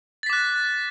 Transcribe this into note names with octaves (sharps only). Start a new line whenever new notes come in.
D6 F#6 A6 B6